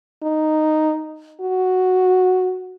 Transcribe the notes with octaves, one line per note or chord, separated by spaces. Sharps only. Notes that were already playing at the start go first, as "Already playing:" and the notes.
D#4
F#4